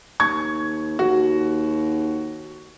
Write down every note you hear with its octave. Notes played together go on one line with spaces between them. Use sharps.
D#2 C#6 G#6
D#2 F#4